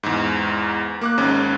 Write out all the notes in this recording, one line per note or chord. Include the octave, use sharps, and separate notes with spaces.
E2 G#2
A#3 D6 F#6
G#1 G#2 C#4